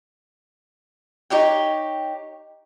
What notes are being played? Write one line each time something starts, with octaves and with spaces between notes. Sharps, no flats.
D#4 G4 C#5 G5